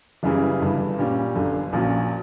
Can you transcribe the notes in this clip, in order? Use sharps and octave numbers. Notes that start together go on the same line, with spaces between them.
F#1 F#2 C#3 E3 G3
G1 G2 E3
A#2 G3 C#4
G1 F#2 D3
A#1 A#2 F#3 C#4